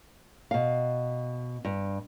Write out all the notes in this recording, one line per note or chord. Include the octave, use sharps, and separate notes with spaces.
B2 F5
G2